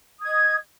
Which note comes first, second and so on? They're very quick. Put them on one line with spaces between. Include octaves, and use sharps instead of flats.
D#6 G#6 D#5